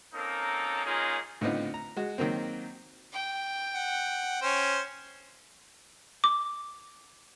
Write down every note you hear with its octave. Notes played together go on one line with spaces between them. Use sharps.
A#3 C4 C#4 D#4 A4 A#4
G#3 A#3 C#4 D#4 F4 G#4
A2 D3 B3 C4 D#4 F4
A#5
G#3 F#4
D#3 F#3 A#3 C4
G5
F#5
C#4 C5
D6